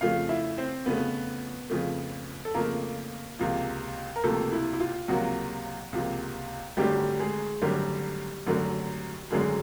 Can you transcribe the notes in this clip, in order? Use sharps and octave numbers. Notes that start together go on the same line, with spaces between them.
F2 C#3 F3 A3 F4 F5
E4 E5
C4 C5
F2 C#3 F3 A3 B3 B4
F2 C#3 F3 A3
A4
F2 C#3 F3 A3 A#3 A#4
C#2 C3 F3 A#3
A#4
C#2 C3 F3 A3 A#3 A4
E4
E4
F4
C#2 C3 F3 F#3 A#3 F#4
C#2 C3 F3 A#3
G#1 F#2 D3 F#3 G3 A3 G4
G#3 G#4
G#1 F#2 D3 F#3 G3 A3 G4
G#1 F#2 D3 F#3 A3
G#1 F#2 D3 F#3 G#3 A3 G#4